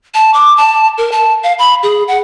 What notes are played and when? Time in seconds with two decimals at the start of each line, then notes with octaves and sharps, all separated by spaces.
0.14 A5
0.34 D6
0.57 A5
0.98 A#4
1.12 A5
1.43 F5
1.59 B5
1.83 G#4
2.08 F#5